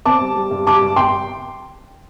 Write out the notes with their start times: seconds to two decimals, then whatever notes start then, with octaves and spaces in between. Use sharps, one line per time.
0.06 C4 A5 D6
0.21 G3
0.36 G3
0.51 G2
0.67 G3 A5 D6
0.82 G2
0.96 G5 C6